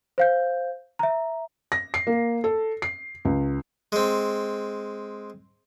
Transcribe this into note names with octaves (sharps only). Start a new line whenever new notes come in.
C5 F5 G6
E5 A#5
A#6
C7
A#3
A4
C7
C#2
G#3 C4